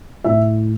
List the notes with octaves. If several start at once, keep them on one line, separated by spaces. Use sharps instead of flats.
A2 E5